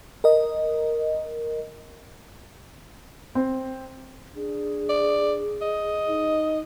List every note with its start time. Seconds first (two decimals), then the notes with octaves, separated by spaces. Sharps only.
0.24 A#4 D#5
3.35 C4
4.36 D4 G#4
4.89 D5
5.61 D#5
6.09 D#4